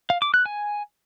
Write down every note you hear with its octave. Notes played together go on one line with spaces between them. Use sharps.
F5
D6
F#6
G#5